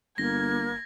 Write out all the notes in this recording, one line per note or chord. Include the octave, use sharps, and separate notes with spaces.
G1 A#3 G#6 A#6